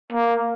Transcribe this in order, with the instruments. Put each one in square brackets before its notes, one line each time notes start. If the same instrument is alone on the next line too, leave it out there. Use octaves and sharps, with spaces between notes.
[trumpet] A#3